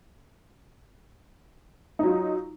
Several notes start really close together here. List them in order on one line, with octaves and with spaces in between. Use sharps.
D#4 F#3 F4